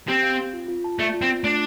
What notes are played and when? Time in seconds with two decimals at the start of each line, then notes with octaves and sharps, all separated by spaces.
0.08 C4 G4
0.23 F5
0.39 C4
0.53 F4
0.68 F4
0.84 A5
0.99 A3 D5
1.14 F4
1.22 C4
1.30 F4
1.44 A3 D4